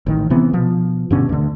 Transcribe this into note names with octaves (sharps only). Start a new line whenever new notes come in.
A1 D#3
C3 E3 B3
B2 F3
G2 B2 D3 C#4
D2 D3